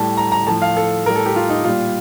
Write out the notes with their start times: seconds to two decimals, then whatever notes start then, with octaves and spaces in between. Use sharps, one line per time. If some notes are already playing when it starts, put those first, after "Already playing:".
Already playing: A2 G3 A5
0.17 A#5
0.32 A#5
0.47 A2 F3 A5
0.62 F5
0.77 A4
1.06 A2 G3 A#4
1.16 A4
1.26 G4
1.36 F4
1.50 D#4
1.64 A#2 G3 F4